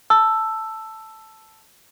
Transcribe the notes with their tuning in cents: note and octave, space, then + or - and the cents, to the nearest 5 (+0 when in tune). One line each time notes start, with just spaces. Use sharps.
A5 +0 E6 +5